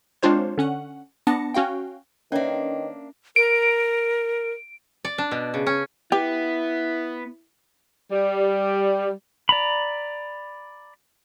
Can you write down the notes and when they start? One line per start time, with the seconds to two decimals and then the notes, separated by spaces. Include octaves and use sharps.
0.23 G#3 C4 D4 F4 C5 C#5
0.57 D3 C#4 F#5
1.27 B3 D4 A5 A#6 C#7
1.54 C#4 F#4 F5 G5
2.32 D#3 A#3 C#4 D4 B4 C#5 D#5 E5
3.36 A#4 D7
5.05 D5
5.18 D4
5.31 B2
5.54 C#3
5.67 C#4
6.12 B3 E4 G4
8.11 G3
9.49 D5 A#5 B5